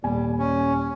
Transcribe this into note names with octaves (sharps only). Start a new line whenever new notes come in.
D#1 G3 G#5
C#4